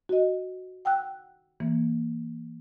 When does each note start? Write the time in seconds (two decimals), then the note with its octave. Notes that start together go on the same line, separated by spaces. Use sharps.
0.09 F#4 D#5
0.85 F#5 G5 E6 F#6
1.60 E3 A#3